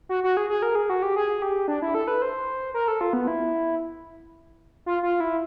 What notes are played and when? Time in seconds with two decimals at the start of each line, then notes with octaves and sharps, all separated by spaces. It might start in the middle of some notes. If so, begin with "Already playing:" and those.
0.09 F#4
0.24 F#4
0.37 G#4
0.50 G#4
0.62 A#4
0.75 G#4
0.90 F#4
1.02 G4
1.16 G#4
1.42 G4
1.68 D4
1.82 E4
1.95 A4
2.08 B4
2.22 C5
2.74 A#4
2.88 A4
3.01 F4
3.13 B3
3.28 E4
4.86 F4
5.03 F4
5.20 E4